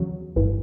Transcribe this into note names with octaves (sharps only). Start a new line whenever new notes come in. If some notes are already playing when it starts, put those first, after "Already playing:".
Already playing: E2 C#3 F#3
G1 G2 E3